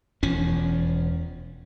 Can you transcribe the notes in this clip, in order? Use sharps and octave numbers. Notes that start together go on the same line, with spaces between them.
E1 E2 F3 C#4